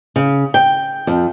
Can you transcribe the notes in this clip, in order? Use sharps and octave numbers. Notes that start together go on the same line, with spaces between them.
C#3
G5
F2